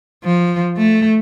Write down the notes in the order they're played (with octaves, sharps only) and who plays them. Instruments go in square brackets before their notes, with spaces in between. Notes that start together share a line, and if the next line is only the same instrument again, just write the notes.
[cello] F3
A3